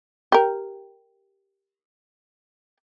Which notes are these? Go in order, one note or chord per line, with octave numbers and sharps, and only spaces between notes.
G4 A#4